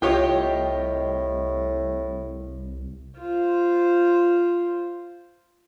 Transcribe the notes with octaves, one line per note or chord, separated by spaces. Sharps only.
C2 A2 F4 G4 C#5 D#5 G5
F4 C5